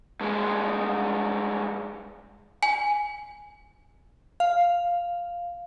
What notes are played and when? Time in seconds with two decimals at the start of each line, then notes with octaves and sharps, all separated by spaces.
0.21 G2 G#3
2.63 G#5
4.40 F5